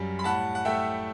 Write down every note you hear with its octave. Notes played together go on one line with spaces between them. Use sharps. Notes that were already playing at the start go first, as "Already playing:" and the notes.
Already playing: F#2 F#3 G3
B5
A2 F#5 A5
F#5
A3 E5 G5